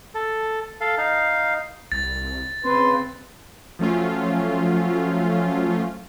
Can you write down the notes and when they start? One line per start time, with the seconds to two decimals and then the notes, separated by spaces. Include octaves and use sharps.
0.14 A4
0.81 A4 F5
0.98 D#4 F5
1.92 C2 A6
2.64 C#3 C4 B4 C6
3.79 F3 F#3 A3 C#4 F4